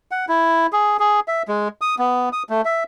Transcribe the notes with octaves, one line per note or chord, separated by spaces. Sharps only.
F#5
E4
G#4
G#4
E5
G#3
D#6
B3
D#6
A3
E5